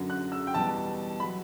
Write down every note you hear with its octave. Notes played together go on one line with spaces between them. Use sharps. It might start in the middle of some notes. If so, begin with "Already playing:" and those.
Already playing: F#2 D3 F#3
F#6
E6
G5
E2 B2 G3 A5
F#3 B5